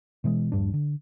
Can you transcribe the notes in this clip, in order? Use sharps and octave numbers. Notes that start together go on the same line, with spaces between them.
B2 E3 F3 G#3
D#1 A#1 G2 D4
D3